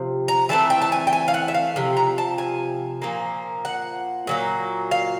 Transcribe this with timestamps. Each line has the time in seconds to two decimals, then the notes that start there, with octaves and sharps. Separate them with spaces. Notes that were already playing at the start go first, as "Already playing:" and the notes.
Already playing: C3 F3
0.28 A#5
0.49 E3 A3 C4 A5
0.70 G5
0.82 A5
0.92 G#5
1.07 G5
1.13 G#5
1.28 F5
1.34 F#5
1.48 E5
1.54 F5
1.76 C3 F3
1.97 A#5
2.18 A5
2.38 G#5
3.02 A#2 F3 A#3
3.65 F#5
4.27 A#2 F#3 A#3
4.91 F5